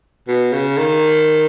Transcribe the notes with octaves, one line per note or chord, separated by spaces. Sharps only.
B2
C#3
D#3